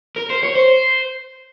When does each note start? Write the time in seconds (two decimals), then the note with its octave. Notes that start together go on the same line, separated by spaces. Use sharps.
0.16 A#4
0.30 C5
0.43 C#5
0.56 C5